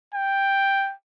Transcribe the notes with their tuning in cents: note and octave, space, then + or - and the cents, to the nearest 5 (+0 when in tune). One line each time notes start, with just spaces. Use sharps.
G5 +5